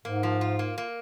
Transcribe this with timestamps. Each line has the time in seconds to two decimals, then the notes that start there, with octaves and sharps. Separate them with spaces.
0.05 G#2 A#3
0.23 F3
0.41 F4
0.59 A#3
0.78 A#3